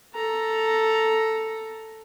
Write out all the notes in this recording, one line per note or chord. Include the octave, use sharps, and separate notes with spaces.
A4 A#5